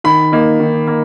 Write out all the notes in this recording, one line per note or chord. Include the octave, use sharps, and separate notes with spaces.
D#3 B5
A#3 D#4
D#3
A#3